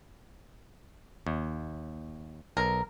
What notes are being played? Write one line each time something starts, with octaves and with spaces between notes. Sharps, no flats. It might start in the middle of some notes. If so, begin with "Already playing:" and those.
D#2
B1 A#4